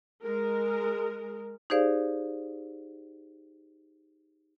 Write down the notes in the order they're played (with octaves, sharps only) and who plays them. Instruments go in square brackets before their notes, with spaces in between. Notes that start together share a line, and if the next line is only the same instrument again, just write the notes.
[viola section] G#3 A#4
[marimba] D#4 G4 G#4 C5 D5 F5